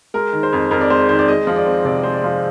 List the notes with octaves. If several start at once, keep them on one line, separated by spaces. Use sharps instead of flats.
G#3 A#4
D#3
C5
F2
F2 A#4
D5
G#3 C5
D#3 C5
D5
G#3 D#5
F3
D5
C4
C3 D5
G#3 C5
D5
F3